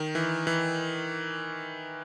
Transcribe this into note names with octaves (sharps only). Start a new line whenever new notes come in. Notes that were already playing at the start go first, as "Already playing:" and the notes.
Already playing: D#3
E3
E3